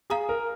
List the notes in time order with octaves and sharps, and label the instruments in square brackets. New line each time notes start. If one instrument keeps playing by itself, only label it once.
[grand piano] G#4 [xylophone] F5 A#5 D#6
[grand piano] A#4